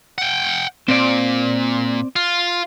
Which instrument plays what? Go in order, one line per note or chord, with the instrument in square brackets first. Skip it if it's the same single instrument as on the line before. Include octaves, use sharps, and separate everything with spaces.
[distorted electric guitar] F#5 G5
[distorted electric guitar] A#2 [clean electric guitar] C4 C5 D5
[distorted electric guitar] F4